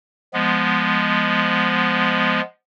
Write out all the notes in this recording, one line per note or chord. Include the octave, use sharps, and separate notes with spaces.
F3 G#3 B3